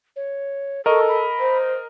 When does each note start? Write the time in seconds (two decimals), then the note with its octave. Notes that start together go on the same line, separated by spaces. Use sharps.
0.16 C#5
0.86 A4 A#4 D#5 C#6
1.08 B5
1.39 C5